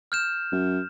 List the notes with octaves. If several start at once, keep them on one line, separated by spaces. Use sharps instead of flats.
F6 G6 E7
F#2